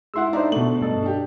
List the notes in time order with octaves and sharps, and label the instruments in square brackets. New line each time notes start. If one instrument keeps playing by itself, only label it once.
[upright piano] G#3 E4 [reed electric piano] F#5 C6 E6
[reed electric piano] D4 D#4 C5 [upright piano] D5 E5 A#5
[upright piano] B2 F#7 [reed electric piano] A3 D4
[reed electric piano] G2 A4 D#5
[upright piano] D4 G4